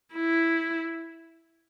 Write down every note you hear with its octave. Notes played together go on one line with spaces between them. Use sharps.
E4